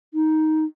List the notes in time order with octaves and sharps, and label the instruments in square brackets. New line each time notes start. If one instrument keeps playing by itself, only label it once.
[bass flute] D#4